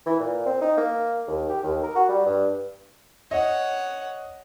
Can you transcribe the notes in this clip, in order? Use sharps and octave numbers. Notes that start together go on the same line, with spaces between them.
E3
A#2
C4
D#4
A#3
D#2
G4
D#2
A#4
F#4
G3
G2
C#5 D#5 F#5